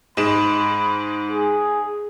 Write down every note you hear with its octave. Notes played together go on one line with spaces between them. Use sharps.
G#2 G#3 B5 E7
G#4